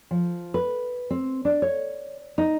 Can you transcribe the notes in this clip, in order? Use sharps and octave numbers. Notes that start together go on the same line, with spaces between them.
F3
B4
C4
D4
C#5
D#4